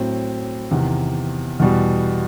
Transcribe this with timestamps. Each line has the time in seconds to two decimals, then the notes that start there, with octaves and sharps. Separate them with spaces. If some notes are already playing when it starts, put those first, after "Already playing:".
Already playing: A2 F#3 C4
0.71 E2 C3 D#3
1.59 E2 B2 G3